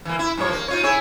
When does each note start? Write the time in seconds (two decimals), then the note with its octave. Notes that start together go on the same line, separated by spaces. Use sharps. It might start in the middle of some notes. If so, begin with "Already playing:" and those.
0.05 E3 A#3
0.19 E4
0.37 G2 F3 C#5
0.51 A#3
0.68 D#4 F4 C#5
0.83 E4 G#4 C#5